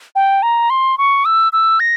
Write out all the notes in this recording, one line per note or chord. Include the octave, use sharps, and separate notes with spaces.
G5
A#5
C6
C#6
E6
E6
A#6